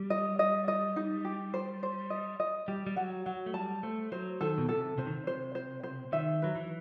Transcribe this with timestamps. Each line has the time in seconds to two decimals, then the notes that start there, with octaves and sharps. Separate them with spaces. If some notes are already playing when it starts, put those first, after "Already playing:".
Already playing: G3
0.10 D#5
0.39 D#5
0.68 D#5
0.96 D#4
1.25 G4
1.54 C5
1.83 C5
2.10 D#5
2.40 D#5
2.68 G3 G4
2.87 G3
2.96 F#3 F#5
3.26 F#3 F#5
3.46 A3
3.54 G3 A5
3.83 A3 C5
4.12 F#3 C5
4.41 D#3 A4
4.58 B2
4.69 C3 A4
4.98 C3 C5
5.06 D#3
5.16 C3
5.27 C5
5.55 C5
5.83 C5
6.12 D#3 E5
6.42 F#3 B4
6.55 E3